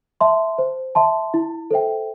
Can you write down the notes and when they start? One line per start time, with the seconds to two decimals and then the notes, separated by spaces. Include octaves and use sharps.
0.21 E5 A5 C6
0.58 C5
0.95 E5 A5 C6
1.34 E4
1.71 A4 C5 E5 G5